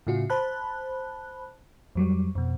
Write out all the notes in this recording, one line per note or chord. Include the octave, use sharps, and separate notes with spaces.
A2 C#3 F4 F#4
C5 A5 B5 F#6
F2 F#3 G3
F2 B2